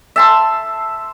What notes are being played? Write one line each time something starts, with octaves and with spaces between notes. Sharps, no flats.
E5 A5 C6